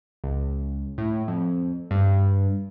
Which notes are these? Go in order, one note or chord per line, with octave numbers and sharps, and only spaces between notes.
C#2
A2
F2
G2